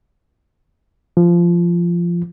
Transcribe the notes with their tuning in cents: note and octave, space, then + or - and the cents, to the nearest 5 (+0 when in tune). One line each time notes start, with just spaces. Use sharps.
F3 -15